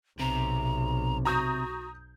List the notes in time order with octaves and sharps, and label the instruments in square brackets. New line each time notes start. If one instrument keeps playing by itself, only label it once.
[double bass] B1 [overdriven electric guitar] C3 [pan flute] A#5
[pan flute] F#4 [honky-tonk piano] A#5 D#6 G6